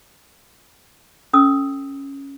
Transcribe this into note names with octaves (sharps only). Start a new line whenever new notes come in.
C#4 A4 D#6 E6